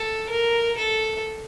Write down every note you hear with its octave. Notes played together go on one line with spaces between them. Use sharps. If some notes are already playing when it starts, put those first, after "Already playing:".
Already playing: A4
A#4
A4